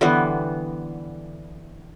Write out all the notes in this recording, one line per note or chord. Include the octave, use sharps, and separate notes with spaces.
D3 E3 G3 B3